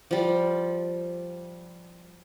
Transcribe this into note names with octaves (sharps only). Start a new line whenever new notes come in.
F3 G3